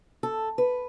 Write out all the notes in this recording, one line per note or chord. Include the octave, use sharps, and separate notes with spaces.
A4
B4